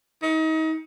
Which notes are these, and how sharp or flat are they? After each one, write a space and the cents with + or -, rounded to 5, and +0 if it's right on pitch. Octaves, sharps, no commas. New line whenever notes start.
D#4 +35